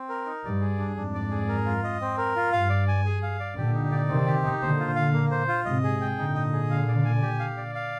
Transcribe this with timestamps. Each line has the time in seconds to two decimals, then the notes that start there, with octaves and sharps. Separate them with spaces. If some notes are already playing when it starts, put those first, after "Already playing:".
Already playing: C4
0.09 A#4
0.26 D#4
0.44 G2 D5
0.61 G#4
0.79 D4
0.96 F2 G#2 D4
1.14 D5
1.31 G#4
1.48 A#4
1.65 F4
1.84 D#5
2.01 C4
2.18 A#4
2.36 F4
2.52 G2 F5
2.70 D5
2.88 G#5
3.05 G#4
3.22 F5
3.40 D5
3.57 A#2 D3 G4
3.74 D#4
3.92 D5
4.09 C3 D#3 C4
4.26 G4
4.44 D#4
4.61 A#2 D3 C5
4.79 F4
4.96 F5
5.13 A#3
5.31 C5
5.48 F4
5.65 G#2 C3 D#5
5.84 G#4
6.01 G5
6.17 A#2 D3 D#4
6.35 D#5
6.53 G#4
6.70 F5
6.88 D5
7.05 G#5
7.22 G4
7.39 F5
7.57 D5
7.75 F5